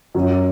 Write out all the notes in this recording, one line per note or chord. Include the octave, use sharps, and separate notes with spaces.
F#2